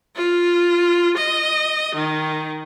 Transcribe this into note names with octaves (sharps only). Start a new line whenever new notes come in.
F4
D#5
D#3